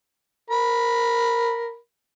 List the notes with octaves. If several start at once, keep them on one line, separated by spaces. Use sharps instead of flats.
A#4 B5